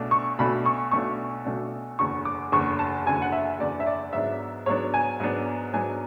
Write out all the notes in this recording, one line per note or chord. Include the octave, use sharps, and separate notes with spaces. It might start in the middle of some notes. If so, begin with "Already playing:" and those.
Already playing: B1 B2 A3 D4
C#6
B1 B2 A3 D4 B5
C#6
B1 B2 A3 D4 C#6
B1 B2 A3 D4
F#1 E2 D3 C#6
D6
F#1 E2 D3 C#6
A5
F#1 E2 D3 G#5
F#5
E5
F#1 E2 D3 D5
E5
D5
G#2 F#3 B3 D4 E5
G#2 F#3 B3 D4 C#5
G#5
G#2 F#3 B3 D4
G#2 F#3 B3 D4 G#5